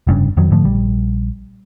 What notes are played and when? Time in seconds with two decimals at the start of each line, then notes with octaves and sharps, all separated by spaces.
0.07 F1 G2 C#3
0.37 F2 D#3 F#3
0.51 G#2 D3 F3 A3
0.64 A#1 G3